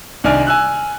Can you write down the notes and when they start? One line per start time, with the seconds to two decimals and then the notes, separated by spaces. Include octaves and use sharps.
0.24 C2 D#3 D4 D5 G#5 F6
0.47 G#5 E6 F#6